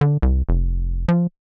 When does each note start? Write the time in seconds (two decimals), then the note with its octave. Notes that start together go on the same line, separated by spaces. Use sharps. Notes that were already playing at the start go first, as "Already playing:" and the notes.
0.01 D3
0.22 C2
0.49 F1
1.08 F3